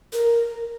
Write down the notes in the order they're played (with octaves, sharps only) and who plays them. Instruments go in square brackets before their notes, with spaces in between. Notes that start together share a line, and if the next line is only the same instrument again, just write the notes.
[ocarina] A#4